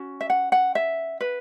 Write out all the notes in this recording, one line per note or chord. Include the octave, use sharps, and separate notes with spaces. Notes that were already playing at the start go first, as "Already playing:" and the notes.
Already playing: C#4 F#4
E5
F#5
F#5
E5
B4